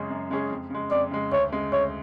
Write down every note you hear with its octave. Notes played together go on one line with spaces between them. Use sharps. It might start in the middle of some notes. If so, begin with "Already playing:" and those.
Already playing: F#2 C#3 G#3 C#4 G#4
F#2
C#3 G#3 C#4 G#4
F2
C#3 G#3
F2 D5
C#3 G#3
D2 C#5
C#3 G#3
D2 C#5